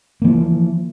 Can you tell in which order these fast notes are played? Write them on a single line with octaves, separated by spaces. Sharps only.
A#3 E3 F3